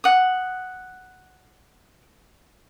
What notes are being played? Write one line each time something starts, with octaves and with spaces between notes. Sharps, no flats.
F#5 D#6